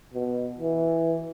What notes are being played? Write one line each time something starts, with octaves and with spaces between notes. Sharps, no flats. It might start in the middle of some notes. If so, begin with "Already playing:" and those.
B2
E3